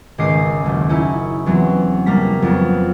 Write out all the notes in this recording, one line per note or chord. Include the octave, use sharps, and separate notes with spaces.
G#1 C#2 C#4 D#5 D6 C7
F#1 D#2
C#4 D#4 E4
E2 F#3 B3 C4
F#1 G3 A#3 A#5 B6
F2 F#3 B3